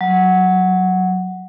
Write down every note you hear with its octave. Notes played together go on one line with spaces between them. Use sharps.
F#3